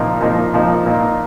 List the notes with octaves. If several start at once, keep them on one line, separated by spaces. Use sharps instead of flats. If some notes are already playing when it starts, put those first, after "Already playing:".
Already playing: A#2 F3 A#3 D#4
A#2 F3 A#3 D#4
A#2 F3 A#3 D#4
A#2 A#3 D#4